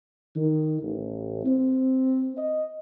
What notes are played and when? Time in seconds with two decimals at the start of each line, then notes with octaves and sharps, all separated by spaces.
0.36 D#3
0.81 A1
1.44 C4
2.37 D#5